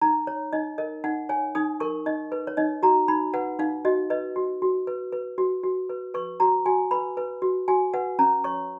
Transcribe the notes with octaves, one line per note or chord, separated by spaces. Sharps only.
D#4 A#5
C#5
D#4 D#5
A#4 D#5
D#4 F#5
C#5 G#5
D#4 D#6
A#4 C#6
D#4 D#5
B4
C#5
D#4 D#5
F#4 A#5
D#4 B5
B4 F#5
D#4 F5
F#4 D#5
B4 D#5
F#4
F#4
B4
B4
F#4
F#4
B4
B4 C#6
F#4 A#5
F#4 G#5
B4 B5
B4
F#4
F#4 G#5
B4 F#5
C#4 A#5
C#5 C#6